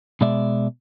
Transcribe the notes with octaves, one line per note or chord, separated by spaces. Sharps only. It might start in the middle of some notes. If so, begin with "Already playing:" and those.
B2 G#3 D5 E5